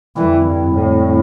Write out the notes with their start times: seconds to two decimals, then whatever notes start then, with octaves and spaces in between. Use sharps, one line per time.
0.16 F2 D3 E3 G3 C4 E4
0.46 G2
0.75 A2